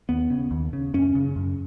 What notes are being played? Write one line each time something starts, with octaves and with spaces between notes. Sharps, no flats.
D#2 B3
C#3
D#2
C#3
F#2 C#4
C#3
F#2